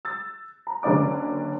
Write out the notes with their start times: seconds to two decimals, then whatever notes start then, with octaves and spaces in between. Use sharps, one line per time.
0.05 E6 A6
0.67 A#5
0.83 F#1 D3 C#4 D5 D6